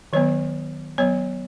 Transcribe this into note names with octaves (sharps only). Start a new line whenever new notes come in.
D#3 F#3 B3 C#5
F#3 B3 C#5